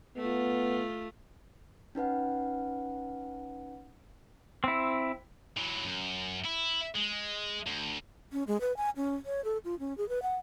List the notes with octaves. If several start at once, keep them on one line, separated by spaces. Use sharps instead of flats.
A3 B3 F4
C#4 D#4 B4 F#5
C4 E4
E3 F#3
F#2
E4
G#3
D2
C#4
G#3
B4
G#5
C#4
C#5
A4
F4
C#4
G#4
B4
F#5